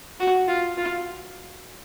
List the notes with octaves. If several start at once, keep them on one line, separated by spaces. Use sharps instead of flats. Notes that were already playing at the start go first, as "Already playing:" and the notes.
F#4
F4
F4